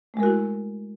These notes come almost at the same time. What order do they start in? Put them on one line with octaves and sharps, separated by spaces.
A3 G#3 A#4 F#4 E4